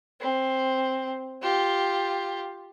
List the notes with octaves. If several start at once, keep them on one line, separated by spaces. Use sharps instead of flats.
C4
F4 G4